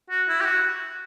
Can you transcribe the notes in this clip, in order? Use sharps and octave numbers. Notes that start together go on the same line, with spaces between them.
F#4
E4
G4
F#4